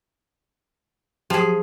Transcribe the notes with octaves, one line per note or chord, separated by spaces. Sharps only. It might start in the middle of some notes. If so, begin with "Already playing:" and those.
F3 F#3 G4 G#4